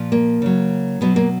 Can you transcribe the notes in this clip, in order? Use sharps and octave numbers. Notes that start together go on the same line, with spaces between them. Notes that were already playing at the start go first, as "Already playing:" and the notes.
Already playing: A#2 F3
A#3
C#3 F#3
B2 F#3 B3
A#3